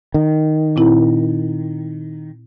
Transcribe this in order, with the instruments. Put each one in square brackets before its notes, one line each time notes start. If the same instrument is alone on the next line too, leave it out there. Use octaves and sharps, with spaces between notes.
[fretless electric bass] D#3
[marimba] A#2 C4 E4